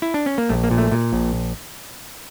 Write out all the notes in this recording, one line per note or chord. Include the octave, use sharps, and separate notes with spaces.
E4
D4
C#4
A#3
A#1 A3
A#3
A#2
A3
A#2
A#1